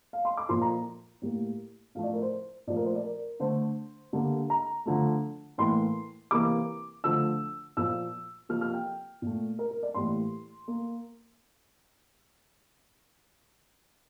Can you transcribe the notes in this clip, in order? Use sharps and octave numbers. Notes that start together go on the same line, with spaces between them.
F5
C6
D6
A#2 F3 A#3 C6
A#5
A2 G3 A#3
A2 F3 A3 F5
D5
A#4
C5
A#2 F3 A3 D5
A#4
C5
D5
A#4
D3 A3 C5
D3 G3 A#3
A#5
D3 F3 A3
A2 E3 A#3 C6
C3 E3 A#3 D6
D3 F3 A3 E6
A#2 F3 A#3 E6
C3 F3 A#3 F6
F6
G5
A#2 A3
A#4
A#4
D5
A2 E3 G3 A#3 C6
A#3